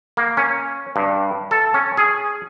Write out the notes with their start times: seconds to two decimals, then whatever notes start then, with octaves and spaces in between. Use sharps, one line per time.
0.17 A#3
0.37 C#4
0.96 G2
1.51 A4
1.74 C#4
1.97 G#4